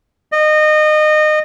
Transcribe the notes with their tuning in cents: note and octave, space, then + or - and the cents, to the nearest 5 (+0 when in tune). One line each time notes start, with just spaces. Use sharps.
D#5 -25